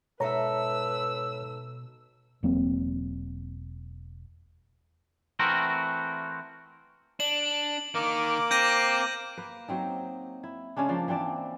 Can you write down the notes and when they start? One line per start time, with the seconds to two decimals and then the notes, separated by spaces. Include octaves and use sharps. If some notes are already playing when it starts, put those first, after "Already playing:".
0.20 G#2 B2 A4 B4 C#5 E5 A#5 E6
2.43 E1 F#3 A#3 C4
5.39 E3 A3 C4 F#4 A#4
7.20 D4 F#7
7.95 D#3 A#3 A#4 D6
8.51 C4 G6 A#6 D#7
9.37 A#3 B4
9.68 F#3 C4 D#4
10.43 E4
10.76 C#3 G#3 C#4 D4
10.89 F3 A#3 D4
11.08 E3 C4 D4 D5